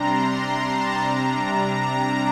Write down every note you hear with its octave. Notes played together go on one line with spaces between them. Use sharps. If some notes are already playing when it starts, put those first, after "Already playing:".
Already playing: C3 G3 D4 A#5 C6
A#5
A5
C3 G3 D4 A#5
A#5